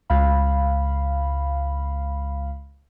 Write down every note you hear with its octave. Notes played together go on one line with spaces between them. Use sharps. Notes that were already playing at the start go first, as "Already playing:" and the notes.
C#2 F5 B5